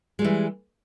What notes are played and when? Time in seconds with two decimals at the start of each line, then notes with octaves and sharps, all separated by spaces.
0.19 G#3
0.22 G3
0.24 E3